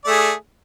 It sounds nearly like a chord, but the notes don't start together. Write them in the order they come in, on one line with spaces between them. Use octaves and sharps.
D5 A3 G#4